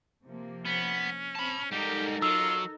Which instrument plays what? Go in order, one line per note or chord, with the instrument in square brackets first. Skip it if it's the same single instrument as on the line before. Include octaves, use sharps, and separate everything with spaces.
[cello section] C3 F3 A#3
[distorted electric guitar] B3 [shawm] C#4
[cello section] C4 [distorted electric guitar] A5 B5
[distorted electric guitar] G#2 G3 [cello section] D#4 A4 A#4 [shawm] G4
[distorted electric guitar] F#3 [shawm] F4 [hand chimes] E6